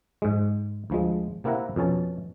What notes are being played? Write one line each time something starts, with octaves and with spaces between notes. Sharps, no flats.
G#2 G#3
D2 F3 G#3
C3 A#3 C4 E4 F#5 A#5
F2 B2 C#4 A5